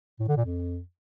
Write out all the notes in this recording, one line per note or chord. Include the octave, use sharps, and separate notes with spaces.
A2
D3
A#2
F2